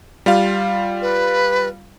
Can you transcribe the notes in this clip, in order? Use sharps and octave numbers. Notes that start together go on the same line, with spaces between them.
G3 F4 F5
B4